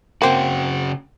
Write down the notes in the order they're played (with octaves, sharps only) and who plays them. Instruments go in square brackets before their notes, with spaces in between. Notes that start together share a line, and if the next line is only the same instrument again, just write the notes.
[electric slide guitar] C#3 F#4 [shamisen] A#3 C4